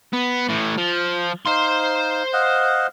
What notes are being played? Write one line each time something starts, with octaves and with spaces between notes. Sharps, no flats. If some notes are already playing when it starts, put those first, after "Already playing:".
B3
A2 E3
F3
D#4 C5 F5 C6
D#5 F5 F#5